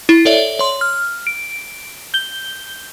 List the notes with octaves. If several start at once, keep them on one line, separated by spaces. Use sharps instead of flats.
E4
A4 C#5 D5 E5
C#5 C6
F6
D7
G6 G7